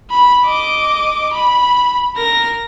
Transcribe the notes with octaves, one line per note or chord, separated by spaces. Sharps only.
B5
D#5 D6
B5
A#4 A#6